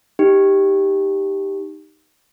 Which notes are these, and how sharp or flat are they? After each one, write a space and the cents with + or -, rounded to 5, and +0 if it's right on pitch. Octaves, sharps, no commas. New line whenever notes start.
D#4 +0 G4 +0